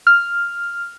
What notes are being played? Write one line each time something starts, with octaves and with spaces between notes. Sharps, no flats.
F6